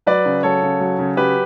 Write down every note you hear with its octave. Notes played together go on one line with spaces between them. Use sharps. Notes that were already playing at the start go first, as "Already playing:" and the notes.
F#3 B4 D5
C#3
F#3 A4 C#5
C#3
F#3
C#3
F#3 G4 B4